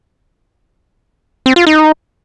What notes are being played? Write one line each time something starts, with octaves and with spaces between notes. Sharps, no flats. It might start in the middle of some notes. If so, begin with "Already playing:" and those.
C4
F4
D#4